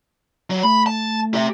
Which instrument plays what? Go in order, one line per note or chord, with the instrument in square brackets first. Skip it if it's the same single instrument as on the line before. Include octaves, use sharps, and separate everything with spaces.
[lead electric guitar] F#3
[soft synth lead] A3 [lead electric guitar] B5
[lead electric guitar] A5
G4 E5